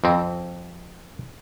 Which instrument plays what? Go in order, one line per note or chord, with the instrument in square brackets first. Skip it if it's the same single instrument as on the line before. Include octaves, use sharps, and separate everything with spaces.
[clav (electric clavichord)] F2 C4